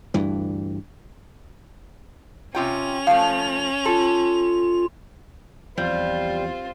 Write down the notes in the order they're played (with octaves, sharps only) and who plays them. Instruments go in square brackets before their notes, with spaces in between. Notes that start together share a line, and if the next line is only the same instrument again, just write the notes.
[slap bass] D2 G2 E3
[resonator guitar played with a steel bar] C3 F4 G5 [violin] C#4 F7
[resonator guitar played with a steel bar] F3 A3 [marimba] F5
[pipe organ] F4 [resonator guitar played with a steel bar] A4
[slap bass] E2 F3 [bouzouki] G3 [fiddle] C4 F4